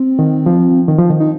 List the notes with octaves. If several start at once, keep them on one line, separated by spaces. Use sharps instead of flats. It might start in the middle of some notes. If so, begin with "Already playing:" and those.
Already playing: C4
D#3
F3
D#3
F3
D#3
D#4